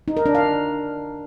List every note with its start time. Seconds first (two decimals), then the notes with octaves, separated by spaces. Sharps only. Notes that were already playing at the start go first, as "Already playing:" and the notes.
0.08 D#4
0.17 A#4
0.26 D4
0.35 F5